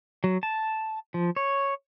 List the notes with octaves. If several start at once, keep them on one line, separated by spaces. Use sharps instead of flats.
F#3
A5
F3
C#5